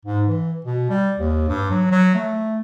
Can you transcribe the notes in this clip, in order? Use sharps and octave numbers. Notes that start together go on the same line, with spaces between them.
G#2
E3
B2
G3
D#2
G2
F#3
F#3
A3